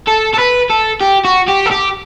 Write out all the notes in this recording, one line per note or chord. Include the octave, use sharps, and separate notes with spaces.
A4
A4
B4
A4
G4
F#4
G4
A4
G4